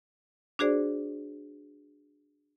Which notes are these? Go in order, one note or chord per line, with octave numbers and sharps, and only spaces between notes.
D4 F#4 G#4 C5 D5